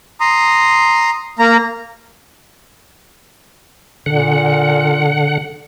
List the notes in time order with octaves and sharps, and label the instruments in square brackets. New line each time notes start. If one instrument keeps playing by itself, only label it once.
[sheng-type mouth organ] A#5 C6 D#6
A#3 A#5
[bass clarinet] A#2 [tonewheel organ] D3 F#5